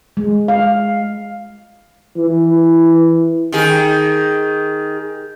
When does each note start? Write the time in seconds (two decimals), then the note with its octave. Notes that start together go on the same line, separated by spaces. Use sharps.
0.17 G#3
0.48 F5
2.17 E3
3.52 D#3 G#4